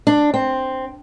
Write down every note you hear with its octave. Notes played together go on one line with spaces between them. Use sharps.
D4
C4